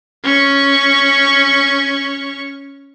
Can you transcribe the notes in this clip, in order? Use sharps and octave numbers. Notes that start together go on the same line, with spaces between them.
C#4 C#6